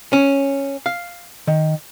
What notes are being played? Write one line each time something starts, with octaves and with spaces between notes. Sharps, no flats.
C#4
F5
D#3